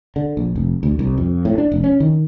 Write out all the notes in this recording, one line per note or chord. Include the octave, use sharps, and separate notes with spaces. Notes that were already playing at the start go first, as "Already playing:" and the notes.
D3
A#1
F1
D2
C2
F2
A2
D4
F1
C#4
D#3